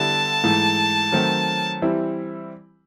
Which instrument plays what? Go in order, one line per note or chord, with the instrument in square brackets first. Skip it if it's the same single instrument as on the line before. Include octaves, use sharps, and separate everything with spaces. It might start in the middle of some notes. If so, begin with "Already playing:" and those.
Already playing: [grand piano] D3 G3 B3 E4 G4 [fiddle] A5
[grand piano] G#2 E3 A3
D#3 F#3 A3 C4
E3 G3 C4 E4